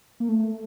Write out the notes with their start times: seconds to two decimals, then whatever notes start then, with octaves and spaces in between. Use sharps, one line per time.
0.20 A#3
0.29 A3